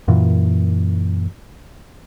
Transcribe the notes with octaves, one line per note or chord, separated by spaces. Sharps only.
F#2 A#2 E3